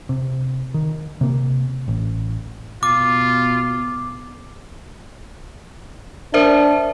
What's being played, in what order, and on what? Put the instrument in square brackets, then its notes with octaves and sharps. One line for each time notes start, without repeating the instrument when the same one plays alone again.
[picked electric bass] C3
D#3
C3 A#3
A1
[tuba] B2 [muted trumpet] F4 [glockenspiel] D6
[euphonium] D4 [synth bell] A#4 C5 E5